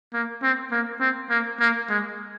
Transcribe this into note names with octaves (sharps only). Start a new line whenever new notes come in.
A#3
C4
A#3
C4
A#3
A#3
G#3